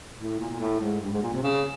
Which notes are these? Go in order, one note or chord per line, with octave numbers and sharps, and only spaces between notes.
A2
A#2
A#2
A2
G#2
G2
G#2
A#2
C3
C#3